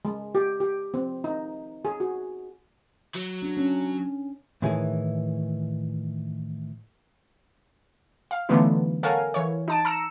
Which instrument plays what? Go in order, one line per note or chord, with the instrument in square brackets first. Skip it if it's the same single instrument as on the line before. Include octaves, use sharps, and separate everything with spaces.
[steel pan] G#3
G4
G4
C4
D#4
G#4
F#4
[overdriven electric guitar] F#3
[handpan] D4
C#4
[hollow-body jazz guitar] A2 D#3 E3 G#4
[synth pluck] F5
D3 E3 F#3 A3 B3 D#4
A4 A#4 C#5 F5 F#5 G#5
E3 C#5
D#4 A5 D7
A#5 E6 C#7 E7